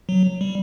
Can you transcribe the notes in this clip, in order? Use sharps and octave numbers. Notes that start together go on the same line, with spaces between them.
F#3
G3